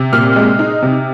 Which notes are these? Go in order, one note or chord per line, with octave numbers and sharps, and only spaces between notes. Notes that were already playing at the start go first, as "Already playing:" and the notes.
Already playing: C3
A#2 F6
G#3
D#4
C3